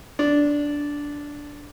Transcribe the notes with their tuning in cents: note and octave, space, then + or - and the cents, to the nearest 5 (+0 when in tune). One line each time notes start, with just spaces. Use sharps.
D4 -10